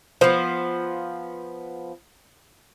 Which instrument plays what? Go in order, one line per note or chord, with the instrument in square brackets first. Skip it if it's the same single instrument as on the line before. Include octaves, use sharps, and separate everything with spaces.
[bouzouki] F3 B3 [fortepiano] C5